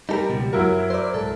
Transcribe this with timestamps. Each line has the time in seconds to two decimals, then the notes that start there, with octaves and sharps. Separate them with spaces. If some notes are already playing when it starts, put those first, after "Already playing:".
0.09 G3 D#4 A4 A#4
0.30 C#2 B2 F3
0.53 F#2 F#3 E4 F#4 A#4
0.90 C5 D5
1.14 C2 G#2 A4